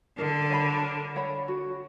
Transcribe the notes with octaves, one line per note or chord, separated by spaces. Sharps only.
D3 A#4
C#5 F#5 B5
A#4
C#5 F#5 B5
F#4